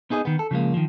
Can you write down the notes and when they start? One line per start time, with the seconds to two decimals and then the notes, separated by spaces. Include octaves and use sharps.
0.10 B3 D#4 G#4 C5 D#5
0.25 D#3 B3
0.39 A4
0.51 C#3 F3 G#3 A#3
0.74 D#3 F3